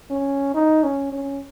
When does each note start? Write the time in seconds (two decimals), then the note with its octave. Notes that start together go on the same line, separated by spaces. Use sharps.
0.10 C#4
0.55 D#4
0.84 C#4
1.13 C#4